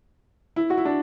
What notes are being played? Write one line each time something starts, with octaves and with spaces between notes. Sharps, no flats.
E4
F#4
E4
D4